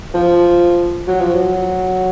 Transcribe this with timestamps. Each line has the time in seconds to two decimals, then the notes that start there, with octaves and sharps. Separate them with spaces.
0.15 F3
1.08 F#3
1.20 F3
1.34 F#3